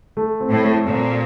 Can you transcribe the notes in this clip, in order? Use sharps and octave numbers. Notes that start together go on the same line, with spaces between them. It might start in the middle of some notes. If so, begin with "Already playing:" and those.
A3
C4
A2
A3
A#2 C4